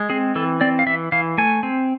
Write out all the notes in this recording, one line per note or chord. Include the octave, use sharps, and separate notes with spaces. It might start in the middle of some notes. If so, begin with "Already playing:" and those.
Already playing: G#3
C4 G#4
E3 A4
C4 D5
F5
E3 E5
E3 F5
A3 G#5
C4